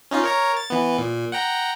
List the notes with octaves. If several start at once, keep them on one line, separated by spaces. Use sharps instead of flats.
C#4 D#4 F4
A#4 C#5 A#5
A6
E3 B3
A#2
F#5 G5 A#5